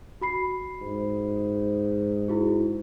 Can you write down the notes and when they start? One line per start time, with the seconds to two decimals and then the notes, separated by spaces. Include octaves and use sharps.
0.21 F#4 B5 C7
0.81 G#2
2.28 E4 F#4 G#4